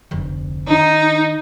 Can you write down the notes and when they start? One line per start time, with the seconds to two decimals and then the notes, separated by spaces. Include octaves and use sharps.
0.11 F1 D2
0.67 D#3 D#4